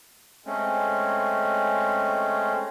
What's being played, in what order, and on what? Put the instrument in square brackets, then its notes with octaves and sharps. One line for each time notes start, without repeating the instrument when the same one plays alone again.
[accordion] G#3 A3 C4 C#4